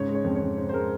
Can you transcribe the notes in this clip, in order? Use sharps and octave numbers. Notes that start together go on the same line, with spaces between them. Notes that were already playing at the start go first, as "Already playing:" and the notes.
Already playing: G#2 C#3 C#5
G#3
C#5
F2
C#5
F2
C#3 C5
C5
G#3 A#4